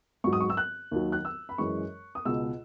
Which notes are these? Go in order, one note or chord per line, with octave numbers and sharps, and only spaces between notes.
G#2 F#3 C#6
D#6
C#6
E6
F#6
D#2 D#3 F#3
F#6
E6
B5
F#2 E3 G#3 C#6
D#6
C#2 B2 G#3 E6